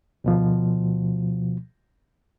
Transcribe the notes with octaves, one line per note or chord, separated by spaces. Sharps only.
D2 B2 F3